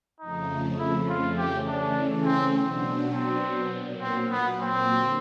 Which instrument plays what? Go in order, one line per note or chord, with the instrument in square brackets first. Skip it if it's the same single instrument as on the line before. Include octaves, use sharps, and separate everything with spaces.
[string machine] F2 C#3 F3 A3 [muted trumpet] D#4
[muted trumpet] E4
F4
[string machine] C#3 E3 A3 C#4 [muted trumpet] G4
[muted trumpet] D4
C4
[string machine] B2 F#3 B3 D4 [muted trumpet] C4
[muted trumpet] C4
[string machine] A#2 F#3 A#3
[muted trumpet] C4
B3
C4
[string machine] D3